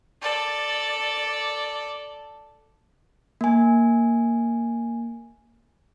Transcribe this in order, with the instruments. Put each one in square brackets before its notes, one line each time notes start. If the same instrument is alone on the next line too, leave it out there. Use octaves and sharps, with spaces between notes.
[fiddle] A4 D5
[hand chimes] A#3 G#5